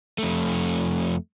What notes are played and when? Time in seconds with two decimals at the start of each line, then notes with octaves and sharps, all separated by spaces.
0.18 F2 A3